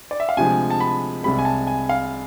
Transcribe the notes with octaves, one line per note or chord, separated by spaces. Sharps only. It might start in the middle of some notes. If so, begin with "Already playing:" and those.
D5
E5
F5
D2 C3 F3 G#3 G#5
A5
B5
C2 C3 G#3 B5
G#5
A5
G#5
F5